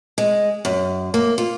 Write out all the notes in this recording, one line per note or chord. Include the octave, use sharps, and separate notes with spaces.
G#3
F#2
A#3
F4